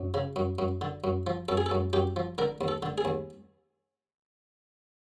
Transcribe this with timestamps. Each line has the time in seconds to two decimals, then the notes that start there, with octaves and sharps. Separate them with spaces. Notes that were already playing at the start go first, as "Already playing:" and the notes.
Already playing: F#2
0.14 C#3
0.36 F#2
0.59 F#2
0.81 D3
1.04 F#2
1.27 F3
1.48 F#2 A4
1.57 G#4
1.66 A4
1.71 F#2
1.93 F#2 G4
2.16 F3
2.38 D3 A#4
2.61 D#2
2.68 A4
2.83 D3
2.98 G#4
3.05 D#2